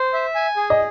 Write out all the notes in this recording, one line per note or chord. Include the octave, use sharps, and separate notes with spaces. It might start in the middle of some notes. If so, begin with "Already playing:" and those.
Already playing: C5
E5
G#5
G#4
D#5